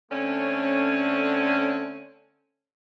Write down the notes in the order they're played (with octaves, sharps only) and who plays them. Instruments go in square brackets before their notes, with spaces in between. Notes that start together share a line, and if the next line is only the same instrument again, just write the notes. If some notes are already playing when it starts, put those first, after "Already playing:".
[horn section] D3 A3 C4 C#4